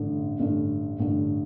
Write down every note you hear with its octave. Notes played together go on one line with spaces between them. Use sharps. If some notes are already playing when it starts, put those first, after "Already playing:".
Already playing: A1 G2 D3
A1 G2 D3
A1 G2 D3